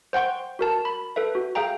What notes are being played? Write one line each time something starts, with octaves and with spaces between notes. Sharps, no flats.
C5 F#5 G5 C6 C#6
F#4 A#4 A5
B5
A4 B4 E5
F#4
G#4 E5 F5 G5 A#5